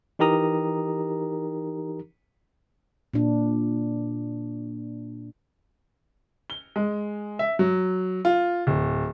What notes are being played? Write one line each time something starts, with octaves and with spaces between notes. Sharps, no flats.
E3 D#4 G4 A#4 A#5 D#6
A#2 D4
G7
G#3
E5
F#3
F4
D1